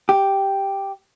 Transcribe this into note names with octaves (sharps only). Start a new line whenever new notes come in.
G4